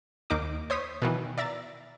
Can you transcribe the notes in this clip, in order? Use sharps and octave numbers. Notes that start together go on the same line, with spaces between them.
D#2 A#3 D#4 D6
C5 C#5 D#6 B6
B2 D#3 E3
D5 E5 A#5 A6